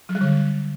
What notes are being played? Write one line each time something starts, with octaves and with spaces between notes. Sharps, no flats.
F#3
G3
D3